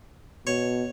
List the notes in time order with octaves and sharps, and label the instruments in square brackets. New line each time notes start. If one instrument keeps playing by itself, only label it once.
[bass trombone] B2 [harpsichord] C#5